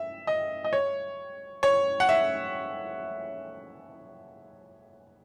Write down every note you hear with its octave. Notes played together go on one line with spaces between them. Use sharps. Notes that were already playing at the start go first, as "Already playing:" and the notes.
Already playing: E5
D#5
D#5
C#5
C#5
F#5
E5